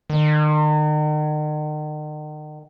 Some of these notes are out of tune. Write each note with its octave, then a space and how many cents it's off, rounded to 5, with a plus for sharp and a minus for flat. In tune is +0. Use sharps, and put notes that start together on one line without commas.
D#3 -40